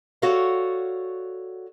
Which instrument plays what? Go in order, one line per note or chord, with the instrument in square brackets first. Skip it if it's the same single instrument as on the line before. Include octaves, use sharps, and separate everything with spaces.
[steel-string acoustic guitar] F#4 A4 C#5 D5 F5 F#5